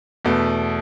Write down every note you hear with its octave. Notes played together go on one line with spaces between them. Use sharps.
E2 B2 A3